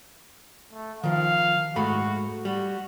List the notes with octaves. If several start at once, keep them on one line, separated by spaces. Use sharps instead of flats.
A3
D#3 F3 F5
G#2 A3 F#4 B5
G3 F#4